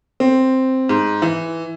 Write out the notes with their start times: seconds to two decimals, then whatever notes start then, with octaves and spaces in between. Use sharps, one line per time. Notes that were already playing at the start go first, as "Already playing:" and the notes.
0.20 C4
0.89 G#2
1.22 E3